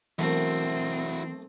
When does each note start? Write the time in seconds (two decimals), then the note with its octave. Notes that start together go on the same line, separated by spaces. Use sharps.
0.19 B1 E3 A3 C4 E4 F#4 A#4